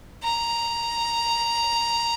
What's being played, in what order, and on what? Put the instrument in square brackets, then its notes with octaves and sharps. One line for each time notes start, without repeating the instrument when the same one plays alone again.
[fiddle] A#5